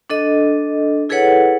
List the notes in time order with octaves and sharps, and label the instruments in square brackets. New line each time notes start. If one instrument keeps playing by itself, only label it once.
[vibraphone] D4 A4 D#5
E4 G#4 A4 B4 C#5 F#5